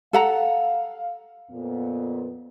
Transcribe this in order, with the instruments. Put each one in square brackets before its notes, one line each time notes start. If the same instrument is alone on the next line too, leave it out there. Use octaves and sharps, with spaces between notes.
[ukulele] A4 F#5 A#5 [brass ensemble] F5
[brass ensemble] F2 A#2 B3